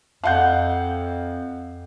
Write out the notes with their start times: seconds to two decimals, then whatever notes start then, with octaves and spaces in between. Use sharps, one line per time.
0.24 F2 F5 F#5 G6